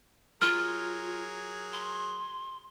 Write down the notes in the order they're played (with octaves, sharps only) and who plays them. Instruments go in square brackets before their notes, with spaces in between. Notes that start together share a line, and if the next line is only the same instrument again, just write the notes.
[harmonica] F#3 G#4 A#4 [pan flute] F4 [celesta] F6
[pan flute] C6